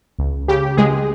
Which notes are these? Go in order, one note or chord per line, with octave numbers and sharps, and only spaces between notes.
C#2
C#3 G4
C#2 G#3 G#4